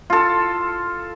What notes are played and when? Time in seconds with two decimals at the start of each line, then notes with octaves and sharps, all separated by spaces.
0.10 F4 A4